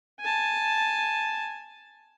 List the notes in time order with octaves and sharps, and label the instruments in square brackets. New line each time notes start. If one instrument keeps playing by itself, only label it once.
[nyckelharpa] G#5 A5